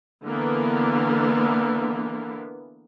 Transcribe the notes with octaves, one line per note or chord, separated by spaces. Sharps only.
D3 E3 A#3 B3